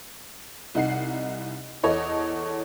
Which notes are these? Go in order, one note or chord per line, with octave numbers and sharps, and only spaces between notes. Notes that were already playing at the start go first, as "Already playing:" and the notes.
C2 D#4 F#5 C7
E2 A4 C#5 D#5